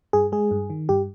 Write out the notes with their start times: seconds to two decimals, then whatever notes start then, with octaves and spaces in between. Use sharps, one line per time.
0.13 G2 G#4
0.32 G#3 G#4
0.51 G2
0.70 D#3
0.89 G2 G4